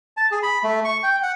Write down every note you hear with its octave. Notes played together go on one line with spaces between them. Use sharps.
A5
G#4
B5
A3
C#6
G5
F#5